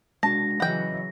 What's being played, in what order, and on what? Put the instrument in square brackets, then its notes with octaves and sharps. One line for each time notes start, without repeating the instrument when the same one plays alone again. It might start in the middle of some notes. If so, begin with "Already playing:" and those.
[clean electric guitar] G#3 D4 F#4 [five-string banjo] A5 [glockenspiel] A#6
[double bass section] C#3 E3 F#3 [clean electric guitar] D#5 B5 [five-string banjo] F#5 G5